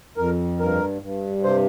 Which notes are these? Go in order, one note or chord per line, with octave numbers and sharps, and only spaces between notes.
F2 A#4
G2 A#4
G2
C3 C5